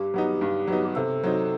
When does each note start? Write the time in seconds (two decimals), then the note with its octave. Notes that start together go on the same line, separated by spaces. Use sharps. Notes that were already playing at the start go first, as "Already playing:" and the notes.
Already playing: G2 G4
0.14 F#3 B3 D#4
0.41 G2
0.67 F#3 B3 D#4
0.96 C3 A4
1.24 F#3 C4 D#4